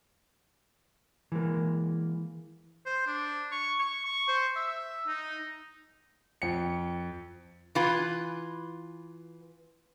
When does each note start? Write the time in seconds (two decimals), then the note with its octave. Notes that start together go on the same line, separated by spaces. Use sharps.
1.32 E3 G#3 A#3
2.86 C5
3.07 D4
3.52 C#6
3.79 C#6
4.05 C#6
4.28 C5
4.56 E5
5.07 D#4
6.42 F2 C#7
7.75 E3 F4 B4